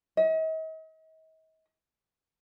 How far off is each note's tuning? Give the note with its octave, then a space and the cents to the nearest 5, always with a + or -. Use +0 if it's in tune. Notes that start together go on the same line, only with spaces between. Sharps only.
D#5 +45